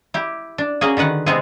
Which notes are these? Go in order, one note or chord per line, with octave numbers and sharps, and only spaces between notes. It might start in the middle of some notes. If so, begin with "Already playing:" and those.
E4 G4
D4
A#3 C#4 F#4 G#4
D3 D#3 B4 F#5
C3 G#3 B3 C4 E4 G#4